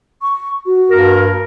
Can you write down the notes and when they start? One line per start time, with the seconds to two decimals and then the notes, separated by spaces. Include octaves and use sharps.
0.22 C#6
0.66 F#4
0.90 G2 A#3 A#4